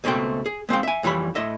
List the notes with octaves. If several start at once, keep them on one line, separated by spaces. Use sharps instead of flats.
C#2 B2 A3 C4 G5
G#4
G#3 C4 F5 G5
E5 G#5
F2 E3 G3 C#5 B5
A2 D#5 E5